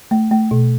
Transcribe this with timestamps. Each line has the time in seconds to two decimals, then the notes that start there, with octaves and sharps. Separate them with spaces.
0.11 A3
0.31 A3
0.51 B2